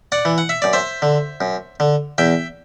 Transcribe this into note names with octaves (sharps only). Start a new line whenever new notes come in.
D5 F#5
E3
F#5
E5
F#2 D5
C5 E5
D3
F#2
D3
E2 E5 G5